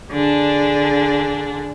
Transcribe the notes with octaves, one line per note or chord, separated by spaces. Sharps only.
D3 D4 G#4